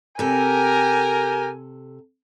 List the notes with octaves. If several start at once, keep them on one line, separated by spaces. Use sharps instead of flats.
C3 G4 A4 A#4 G#5